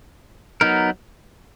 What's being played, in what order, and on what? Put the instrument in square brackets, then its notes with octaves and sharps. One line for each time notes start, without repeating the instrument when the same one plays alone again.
[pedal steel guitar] F#3 B3 D#4 A#4